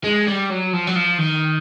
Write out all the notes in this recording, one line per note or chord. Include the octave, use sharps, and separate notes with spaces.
G#3
G3
F#3
F3
F#3
F3
D#3